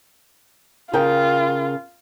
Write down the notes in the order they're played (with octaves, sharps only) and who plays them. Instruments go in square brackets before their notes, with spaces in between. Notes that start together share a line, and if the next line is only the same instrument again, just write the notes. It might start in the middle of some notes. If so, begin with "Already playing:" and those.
[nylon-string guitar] C#3 A#4 G5 [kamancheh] F4